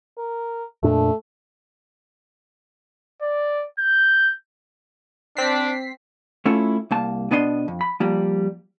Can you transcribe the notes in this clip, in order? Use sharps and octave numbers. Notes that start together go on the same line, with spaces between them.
A#4
F2 A#2 A3 D4
D5
G6
C4 D4 B6 C7
A3 C#4 E4 F4 A4
C2 A#3 A5
B2 B3 D4 D#5 E5 C6
F2
B5
F3 G3 A#3